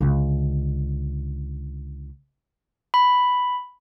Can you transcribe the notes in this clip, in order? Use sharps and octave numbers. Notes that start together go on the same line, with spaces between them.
C#2 D3
B5